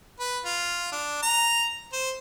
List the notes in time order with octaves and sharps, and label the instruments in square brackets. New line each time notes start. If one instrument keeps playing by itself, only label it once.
[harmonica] B4
F4
D4
A#5
C5